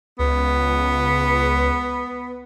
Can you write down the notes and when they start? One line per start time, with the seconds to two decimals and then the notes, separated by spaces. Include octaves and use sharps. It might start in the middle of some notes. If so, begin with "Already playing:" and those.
0.19 C#2 B3